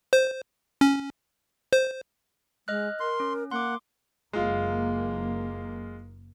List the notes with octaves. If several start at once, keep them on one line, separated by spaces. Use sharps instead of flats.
C5
C#4
C5
G#3 D#5 F6 F#6
A#4 C6
C#4
A#3 F#5 C6 D6
F#1 G#3 A#3 F4